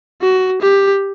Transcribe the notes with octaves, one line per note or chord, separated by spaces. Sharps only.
F#4
G4